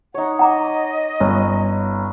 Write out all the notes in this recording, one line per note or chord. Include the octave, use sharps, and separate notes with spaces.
D#4 C#5 F#5
D#5 F#5 A#5 D6
G1 C#4